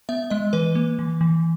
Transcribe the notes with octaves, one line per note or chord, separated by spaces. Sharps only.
B3 E5
G#3 D#5
E3 B4
A#3
E3
E3